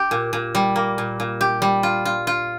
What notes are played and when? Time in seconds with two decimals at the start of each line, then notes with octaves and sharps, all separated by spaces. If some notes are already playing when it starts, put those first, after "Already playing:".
Already playing: G4
0.11 A#2
0.33 A#2
0.55 G3
0.76 A#3
0.98 A#2
1.20 A#2
1.41 G4
1.62 G3
1.83 F4
2.05 F4
2.27 F4